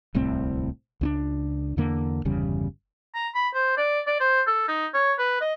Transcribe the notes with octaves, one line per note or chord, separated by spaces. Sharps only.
D1 C2 A2 C4
C#2 C#4 D4
E2 D3 A#3
G1 E2 C#3 G3
A#5
B5
C5
D5
D5
C5
A4
D#4
C#5
B4
D#5